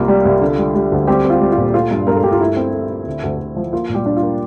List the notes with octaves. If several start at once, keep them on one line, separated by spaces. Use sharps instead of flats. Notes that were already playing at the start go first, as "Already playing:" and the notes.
Already playing: C2 A#3 F4
G3
C2
D3
G3
G3
D2
G3 C4 G4
C4
F4
G3
F4
A#2
A3 F4
G2
G2 A#4
A4
G2 G4
F4
A3 E4
C4
A3
C4
D2
D2
D2
F3
A#3 F4
A#2
G3 G4
D4
F4
A#3